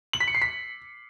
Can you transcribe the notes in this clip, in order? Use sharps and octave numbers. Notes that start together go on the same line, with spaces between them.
F#7
B6
C#7
C7
B6